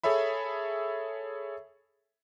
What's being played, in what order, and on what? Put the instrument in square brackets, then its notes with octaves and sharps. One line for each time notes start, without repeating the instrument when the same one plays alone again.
[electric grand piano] G#4 A4 C#5 E5 B5